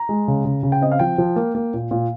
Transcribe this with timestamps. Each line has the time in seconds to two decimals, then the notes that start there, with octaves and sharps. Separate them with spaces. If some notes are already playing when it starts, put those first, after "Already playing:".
Already playing: A#5
0.09 G#3
0.28 C#3
0.45 C#3
0.63 C#3
0.72 G5
0.82 C4 D#5
0.92 F5
0.99 F3 G5
1.18 F3
1.36 A#3
1.55 A#3
1.74 A#2
1.91 A#2